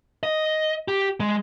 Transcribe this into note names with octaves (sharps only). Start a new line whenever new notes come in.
D#5
G4
G#3